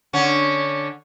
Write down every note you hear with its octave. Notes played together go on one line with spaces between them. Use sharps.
D3 C#4